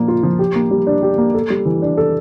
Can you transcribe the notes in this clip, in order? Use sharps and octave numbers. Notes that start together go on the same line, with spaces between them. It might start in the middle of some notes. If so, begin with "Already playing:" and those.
Already playing: A#2 F3 A#3
F4
F3
G4
A#3
G3
D4
G4
A#3
A4
G3
E3
D4
A4